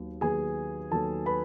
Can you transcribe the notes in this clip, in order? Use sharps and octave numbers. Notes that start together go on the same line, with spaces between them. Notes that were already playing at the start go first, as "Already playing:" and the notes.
Already playing: D#2 D#3 F#3 B3
D#2 D#3 F#3 B3 G#4 G#5
D#2 D#3 F#3 B3 A4 A5
B4 B5